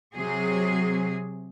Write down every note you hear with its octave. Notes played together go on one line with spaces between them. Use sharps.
C3 F#3 G#4